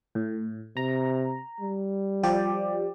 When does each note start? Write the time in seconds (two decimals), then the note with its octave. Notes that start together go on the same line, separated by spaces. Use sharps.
0.15 A2
0.77 C3 A#5
1.61 G3
2.23 F3 G4 D5